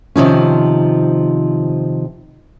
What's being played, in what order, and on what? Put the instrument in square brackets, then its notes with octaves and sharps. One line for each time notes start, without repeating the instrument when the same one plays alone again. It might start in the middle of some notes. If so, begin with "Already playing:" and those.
[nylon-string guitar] C3 D#3 F3 C#4